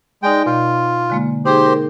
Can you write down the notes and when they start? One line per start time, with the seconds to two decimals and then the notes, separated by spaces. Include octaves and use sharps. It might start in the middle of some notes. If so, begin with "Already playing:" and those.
0.23 G#3 D#4 D5 D#5 G5
0.46 B2 F4
1.10 D3 G#3 A#3
1.46 D#4 G4 G#4 C5
1.66 A#4